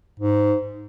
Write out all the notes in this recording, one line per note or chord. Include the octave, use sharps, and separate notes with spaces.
G#2